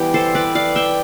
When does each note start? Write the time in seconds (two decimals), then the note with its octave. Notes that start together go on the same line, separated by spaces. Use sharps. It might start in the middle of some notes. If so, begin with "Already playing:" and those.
Already playing: E3 G3 B3 G4 D5
0.14 A4 C5
0.35 B4 D5
0.55 D5 F5
0.76 E5 G5